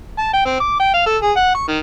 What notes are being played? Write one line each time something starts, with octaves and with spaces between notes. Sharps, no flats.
A5
G5
C4
D6
G5
F5
A4
G#4
F#5
C#6
D#3